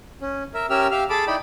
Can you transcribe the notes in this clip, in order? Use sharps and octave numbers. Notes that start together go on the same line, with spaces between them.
C#4
A#4 E5
C#4 G4 A#4 E5 E6 F6
G4 E5 F5 F6
G#4 A4 A5 B5 D6
D#4 E4 D5 G5 B5